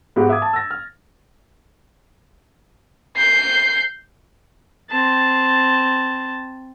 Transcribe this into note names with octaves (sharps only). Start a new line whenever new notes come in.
G#2 G#3 B3 F#4 G4
E5 D6 D#6 G#6
A5
E6 A6 A#6
F6
G6 C7
C4 A5